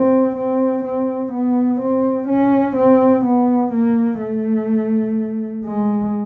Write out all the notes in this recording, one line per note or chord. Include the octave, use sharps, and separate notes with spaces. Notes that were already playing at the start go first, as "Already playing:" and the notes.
Already playing: C4
C4
C4
B3
C4
C#4
C4
B3
A#3
A3
G#3